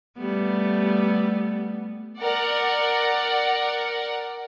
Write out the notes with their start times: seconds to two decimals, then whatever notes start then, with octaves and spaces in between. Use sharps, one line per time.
0.17 G3 A3 B3
2.20 A#4 D5 F#5